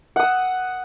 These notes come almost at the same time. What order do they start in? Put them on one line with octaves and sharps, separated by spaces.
F#5 D#6 E6